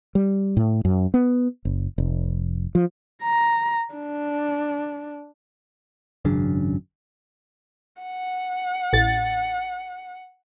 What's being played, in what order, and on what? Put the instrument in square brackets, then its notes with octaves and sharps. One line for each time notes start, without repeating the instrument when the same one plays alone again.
[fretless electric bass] G3
A2
F#2
B3
F#1
F1
F3
[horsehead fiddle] A#5
D4
[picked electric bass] G#1 F#2 C#3 D4
[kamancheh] F#5
[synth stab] A1 A6